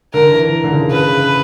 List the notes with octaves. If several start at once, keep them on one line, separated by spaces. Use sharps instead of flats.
D3 A#4
E3
D3
C#3
C#3 B4